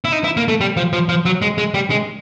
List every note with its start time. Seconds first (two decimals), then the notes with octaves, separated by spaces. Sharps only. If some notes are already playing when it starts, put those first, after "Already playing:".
0.05 E4
0.12 D#4
0.24 E4
0.37 A#3
0.48 A3
0.61 G3
0.77 F3
0.93 F3
1.09 F3
1.25 F#3
1.42 G#3
1.58 G#3
1.74 G3
1.90 G#3